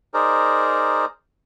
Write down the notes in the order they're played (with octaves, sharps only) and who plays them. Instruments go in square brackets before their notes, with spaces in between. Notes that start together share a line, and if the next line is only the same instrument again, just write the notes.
[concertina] D#4 G#4 A#4 C5 D5